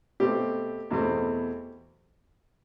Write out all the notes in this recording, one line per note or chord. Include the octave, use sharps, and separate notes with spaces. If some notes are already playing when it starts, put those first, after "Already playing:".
B2 A3 C4 G4
E2 B2 A3 C4